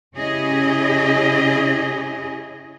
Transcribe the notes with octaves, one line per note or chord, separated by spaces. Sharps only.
C#3 C#4 E4 G4 G#4 D#5